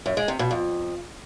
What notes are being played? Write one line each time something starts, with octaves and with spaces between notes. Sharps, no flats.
F#2
G#3
C3
B2
F2